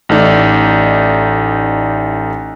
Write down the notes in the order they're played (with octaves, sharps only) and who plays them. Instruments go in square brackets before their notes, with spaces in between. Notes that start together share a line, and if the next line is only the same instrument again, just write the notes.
[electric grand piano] A1 A3 D#4 D5